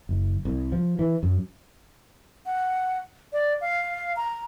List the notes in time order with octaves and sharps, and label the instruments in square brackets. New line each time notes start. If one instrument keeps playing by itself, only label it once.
[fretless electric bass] F#1
C2
F3
E3
F#2
[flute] F#5
D5
F5
A#5